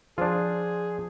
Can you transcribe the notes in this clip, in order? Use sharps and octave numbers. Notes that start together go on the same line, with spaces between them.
F3 D4 F4 G#4 C5